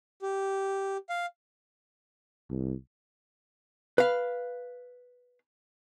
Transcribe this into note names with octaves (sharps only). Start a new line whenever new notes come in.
G4
F5
C2
B4 F5